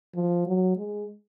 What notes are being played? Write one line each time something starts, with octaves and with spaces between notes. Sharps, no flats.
F3
F#3
G#3